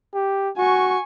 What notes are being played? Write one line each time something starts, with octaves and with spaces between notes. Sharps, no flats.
G4
F#4 G#5 C#6